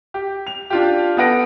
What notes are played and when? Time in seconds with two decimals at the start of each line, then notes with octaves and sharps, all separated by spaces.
0.14 G4
0.47 F7
0.70 D4 F4 G4
1.17 B3 A4 B4 F#5 A#6 D7